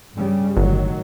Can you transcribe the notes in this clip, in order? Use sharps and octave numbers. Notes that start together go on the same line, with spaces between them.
G2 C#3 G3
G1 A2 D#3 F#3